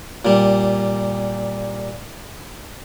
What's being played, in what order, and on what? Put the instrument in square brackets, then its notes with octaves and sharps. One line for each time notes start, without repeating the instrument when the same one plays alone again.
[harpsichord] A#2 G3